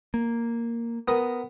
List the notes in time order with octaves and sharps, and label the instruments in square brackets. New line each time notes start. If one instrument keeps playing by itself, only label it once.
[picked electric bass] A#3
[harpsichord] B3 A#4 D#6